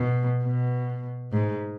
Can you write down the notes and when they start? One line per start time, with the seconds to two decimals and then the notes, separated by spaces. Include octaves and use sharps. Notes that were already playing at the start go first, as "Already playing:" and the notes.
Already playing: B2
0.43 B2
1.33 G#2